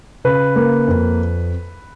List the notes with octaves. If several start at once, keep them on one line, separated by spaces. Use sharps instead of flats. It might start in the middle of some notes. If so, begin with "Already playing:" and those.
C#3 B4
A#3
F2